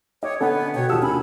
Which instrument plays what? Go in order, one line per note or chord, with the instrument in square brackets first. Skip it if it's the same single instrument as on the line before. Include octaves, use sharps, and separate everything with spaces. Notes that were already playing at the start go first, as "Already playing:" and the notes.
[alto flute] C#5 [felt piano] D#5 D6
[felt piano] D3 D4 G#5 [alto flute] B3 [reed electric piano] A4
[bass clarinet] B2 [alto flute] C#5 [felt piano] G5
[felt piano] D#2 D#6 E6 [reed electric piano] F4 G4 [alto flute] A5
[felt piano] D3 A#3 [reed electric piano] G#5 [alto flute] B5